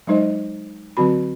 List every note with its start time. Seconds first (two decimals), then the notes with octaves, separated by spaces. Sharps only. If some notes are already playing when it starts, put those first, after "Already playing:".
0.07 F#3 G#3 D#4 C5 D#5
0.97 D3 F#3 C4 F#4 B5